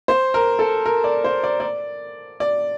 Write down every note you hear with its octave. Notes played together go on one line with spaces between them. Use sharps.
C5
A#4
A4
A#4
D5
C5
D5
D5
D5